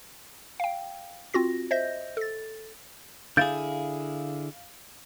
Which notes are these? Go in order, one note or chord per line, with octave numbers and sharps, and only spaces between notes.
F5 G5
C4 F4 F#4 A#6
C5 D#5 E5 G6 A#6
A4 A6
D3 E4 G#4 F5 G6 A6 D7